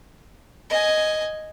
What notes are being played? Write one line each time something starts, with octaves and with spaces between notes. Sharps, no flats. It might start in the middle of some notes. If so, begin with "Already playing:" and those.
D#5 G#5